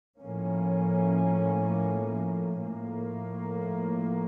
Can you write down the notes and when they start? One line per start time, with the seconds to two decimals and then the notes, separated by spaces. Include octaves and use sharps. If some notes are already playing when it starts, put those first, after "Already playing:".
0.19 A2 F3 A#3 C#4
2.59 A2 F3 A#3